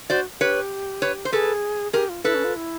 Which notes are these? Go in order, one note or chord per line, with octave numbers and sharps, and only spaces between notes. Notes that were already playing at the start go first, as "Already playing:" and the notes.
F#4 C5 D5
G4 B4 C#5
B4 C#5
C5
G#4 A4 B4
G4 G#4 A#4
F4
E4 A4 B4
C#4
F4
E4